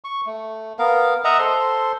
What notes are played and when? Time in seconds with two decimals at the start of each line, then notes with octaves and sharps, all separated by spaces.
0.04 C#6
0.26 A3
0.79 B3 A#4 F5
1.24 D#5 E5 F#5 A#5
1.39 A4 C5 C6